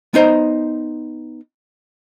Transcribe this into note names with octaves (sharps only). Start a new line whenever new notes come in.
B3 D#4 C5 A#5